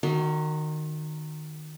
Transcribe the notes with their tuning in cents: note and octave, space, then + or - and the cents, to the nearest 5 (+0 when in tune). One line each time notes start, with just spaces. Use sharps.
D#3 -20 F#4 +0 D#5 +45